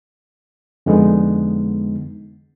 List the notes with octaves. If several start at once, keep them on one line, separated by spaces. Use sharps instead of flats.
F2 D3 G#3 B3 D#4